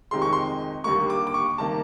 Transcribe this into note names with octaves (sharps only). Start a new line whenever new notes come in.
F2 C3 D#3 G#3 C6
C#6
C6
D#2 D3 G3 A#3 C#6
D6
D6
C#6
C3 D#3 G3 A#3 A5